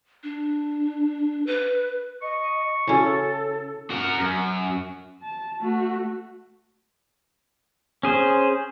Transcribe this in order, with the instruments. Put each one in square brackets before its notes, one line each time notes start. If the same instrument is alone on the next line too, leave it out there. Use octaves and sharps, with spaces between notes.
[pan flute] D4
B4
[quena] D#5 [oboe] C#6
[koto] C#3 C#4 [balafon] E4 F#4 [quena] A4
[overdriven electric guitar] F#4 A#4
F#2
[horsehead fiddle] A5
A3 F#4
[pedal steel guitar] C#4 G#4 C5